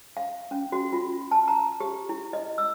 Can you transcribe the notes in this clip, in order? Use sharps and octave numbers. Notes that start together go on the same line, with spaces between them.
F5
C#4
F#4
F4
A5
A#5
G4
E4
D#5
E6